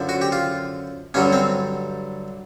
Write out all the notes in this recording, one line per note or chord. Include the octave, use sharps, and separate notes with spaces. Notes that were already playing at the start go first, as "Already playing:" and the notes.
Already playing: F#2 D3 F3
F#4
G4
F4
G2 D3 F#3 C#4
C4